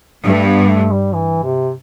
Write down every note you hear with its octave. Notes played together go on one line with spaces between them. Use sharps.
G2 A3
B3
A3
G3
E3
C3